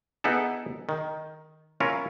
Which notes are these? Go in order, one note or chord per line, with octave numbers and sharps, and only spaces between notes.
B3 D#4 E4 G#4 A4
D#3
C#4 E4 F4 A#4